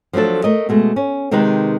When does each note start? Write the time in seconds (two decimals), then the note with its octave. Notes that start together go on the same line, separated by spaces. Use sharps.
0.13 F3 F#3 A3 D4 A4
0.44 A3 A#4 D#5
0.69 B2 G#3 A3
0.96 C#4
1.31 C3 D#3 G#3 D#4 G4 B4